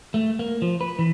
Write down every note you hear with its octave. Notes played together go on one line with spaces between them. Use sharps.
A3
A#3
F3
B4
E3